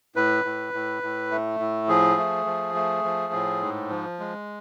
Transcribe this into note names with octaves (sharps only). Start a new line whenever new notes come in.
A2 B4
A2
A2
A2
A3
A2
F3 G#4
A3
F3
A3
F3
A2
G#2
F3
G#3